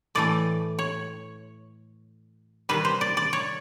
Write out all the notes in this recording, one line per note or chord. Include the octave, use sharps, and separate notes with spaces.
A2 E3 A3 D5
C#5
C3 D#3 G3 B4
C5
D5
D5
C#5